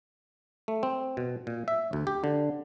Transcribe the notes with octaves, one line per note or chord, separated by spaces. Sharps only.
A3
C4
B2
A#2
E5
D2
G4
D3